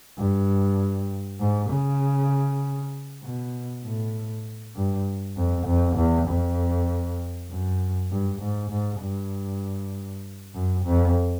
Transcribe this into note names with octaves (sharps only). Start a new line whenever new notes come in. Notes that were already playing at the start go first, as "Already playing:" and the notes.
G2
G#2
C#3
B2
A2
G2
F2
F2
E2
F2
F#2
G2
G#2
G#2
G2
F#2
F2